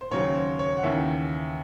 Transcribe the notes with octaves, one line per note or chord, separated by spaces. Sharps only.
C5
D#2 C#3 F#3 C#5
C5
C#5
F#5
D#2 C#3 E3 E5